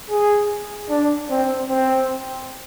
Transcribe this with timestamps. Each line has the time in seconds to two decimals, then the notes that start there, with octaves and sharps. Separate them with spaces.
0.10 G#4
0.90 D4
1.30 C4
1.70 C4